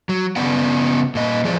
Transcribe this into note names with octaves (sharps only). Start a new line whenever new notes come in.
F#3
C#3 B3 D5 F#5
A#2 D#5
E2 F3 G#4 C5 D5